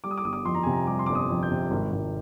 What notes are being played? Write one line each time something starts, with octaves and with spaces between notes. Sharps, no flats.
G3 D6
D#6
D6
G1 D#6
D6
F2 C6
A#5
C3 G#5
A#5
G3 D6
C6
G1 D6
D#6
F2
G6
C3
G#1
G#1